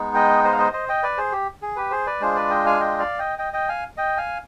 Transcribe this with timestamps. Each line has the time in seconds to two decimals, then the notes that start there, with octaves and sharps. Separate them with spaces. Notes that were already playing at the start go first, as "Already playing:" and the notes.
Already playing: G#3 B3 D#4
0.15 D#5 G5
0.44 C5 D#5
0.52 F5
0.58 C5 D#5
0.73 C5 D#5
0.89 D#5 G5
1.03 B4 D5
1.17 G#4 C5
1.32 G4
1.62 G#4
1.76 G4 B4
1.91 G#4 C5
2.06 B4 D5
2.20 G#3 D4 F4 G#4 C5
2.36 B4 D5
2.50 D#5 G5
2.66 F5 G#5
2.81 D#5 G5
2.99 D5 F5
3.19 D#5 G5
3.38 D#5 G5
3.53 D#5 G5
3.68 F5 G#5
3.97 D#5 G5
4.17 F5 G#5